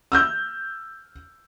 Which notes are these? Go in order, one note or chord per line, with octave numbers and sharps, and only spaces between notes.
E6 F6 G6